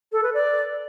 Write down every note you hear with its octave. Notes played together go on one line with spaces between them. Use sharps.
A4
B4
D5